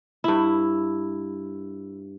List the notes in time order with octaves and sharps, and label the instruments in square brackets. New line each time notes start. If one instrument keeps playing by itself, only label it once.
[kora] G2 E4